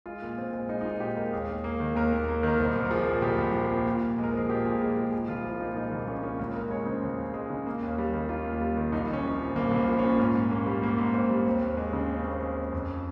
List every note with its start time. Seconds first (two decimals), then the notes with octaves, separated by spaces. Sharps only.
0.06 G#3 F4
0.22 A#2
0.37 A#2 C4
0.53 G#3
0.69 G#3 D#4
0.81 D#4
0.85 A#2 F4
1.00 A#2 G4
1.17 G#3 A#4
1.33 D#2 G#4
1.49 D#2
1.64 A#3
1.80 D#3
1.95 D#2 A#4
2.12 D#2
2.28 A#3
2.43 D#3 A#4
2.60 C2 C5
2.76 C2
2.85 A#4
2.91 F3 G#4
3.06 A#2
3.22 C2 G4
3.38 C2
3.54 F3
3.71 A#2
3.86 A#2
4.01 A#2
4.18 G#3
4.23 A#4
4.34 F3 G#4
4.49 A#2 G4
4.65 A#2 G#4
4.81 G#3 G#4
4.96 F3 G#4
5.12 G#3
5.28 C2 F4
5.45 F3
5.60 A#2 D#4
5.77 G#3 D#4
5.91 C2 A#3
6.08 F3 C#4
6.23 A#2 C#4
6.39 C#2 C#4
6.55 C#2 A#4
6.70 G#3 C#5
6.86 C#3 C5
7.03 C#2
7.18 C#2
7.34 G#3
7.50 C#3
7.66 A#3
7.82 D#2
7.98 G3
8.13 D#3
8.29 A#3 F4
8.46 D#2
8.61 G3
8.77 D#3
8.92 C2 D#4
9.09 C2 C#4
9.24 F3
9.34 C4
9.41 A#2
9.55 C2 A#3
9.71 C2
9.78 C4
9.88 F3
9.99 C#4
10.04 A#2
10.19 G#2 C#4
10.35 G#2
10.50 A#3 C#4
10.66 G3
10.82 G#2 A#3
10.98 G#2
11.14 A#3 C4
11.30 G3
11.45 D#2 C4
11.62 D#2
11.77 G#3 C4
11.93 C#3
12.09 D#2 C#4
12.19 C4
12.25 D#2 C#4
12.41 G#3
12.57 C#3
12.72 F2